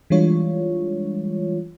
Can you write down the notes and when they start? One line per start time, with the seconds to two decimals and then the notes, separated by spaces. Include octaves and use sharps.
0.10 E3 G3 G#3 D4 F4 C#5